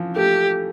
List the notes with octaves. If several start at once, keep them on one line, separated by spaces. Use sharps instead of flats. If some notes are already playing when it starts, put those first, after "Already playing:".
Already playing: E3 F3
A3 G4